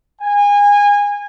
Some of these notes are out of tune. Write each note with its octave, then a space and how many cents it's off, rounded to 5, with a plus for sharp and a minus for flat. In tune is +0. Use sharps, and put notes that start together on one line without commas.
G#5 -25